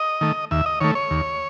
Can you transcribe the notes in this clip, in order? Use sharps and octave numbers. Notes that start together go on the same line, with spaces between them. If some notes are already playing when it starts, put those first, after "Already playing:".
Already playing: D#5
D#3 A3
D#2 E5
D#5
D#3 A3 C#5
C#5
D#2